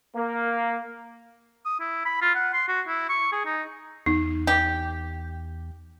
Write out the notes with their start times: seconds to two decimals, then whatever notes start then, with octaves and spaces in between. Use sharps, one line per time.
0.15 A#3
1.66 D#6
1.80 E4
2.06 B5
2.22 F4
2.35 F#5
2.53 C6
2.68 F#4
2.88 E4
3.10 C#6
3.32 G#4
3.46 D#4
4.06 E2 D#4
4.47 G4